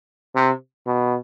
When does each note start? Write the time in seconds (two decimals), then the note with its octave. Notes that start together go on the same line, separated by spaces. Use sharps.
0.36 C3
0.86 B2